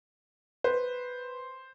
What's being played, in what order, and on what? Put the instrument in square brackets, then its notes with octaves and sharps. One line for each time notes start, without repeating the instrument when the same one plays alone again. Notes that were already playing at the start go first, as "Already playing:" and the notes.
[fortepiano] B4 [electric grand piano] C5